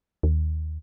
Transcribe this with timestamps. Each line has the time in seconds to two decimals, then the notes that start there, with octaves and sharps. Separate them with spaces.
0.23 D#2